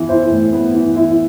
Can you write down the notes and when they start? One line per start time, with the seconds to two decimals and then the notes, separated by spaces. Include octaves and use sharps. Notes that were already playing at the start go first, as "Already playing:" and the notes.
Already playing: E3 B3
0.09 E4 C5
0.30 A2
0.53 B3
0.74 E3
0.96 E4